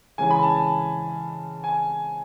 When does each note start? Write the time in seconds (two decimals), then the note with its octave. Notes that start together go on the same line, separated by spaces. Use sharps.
0.18 C#3 E3 G#3 C#4 G#5
0.30 B5
0.43 A5
0.55 A5
1.64 G#5